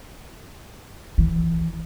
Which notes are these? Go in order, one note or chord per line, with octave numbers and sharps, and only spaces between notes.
E3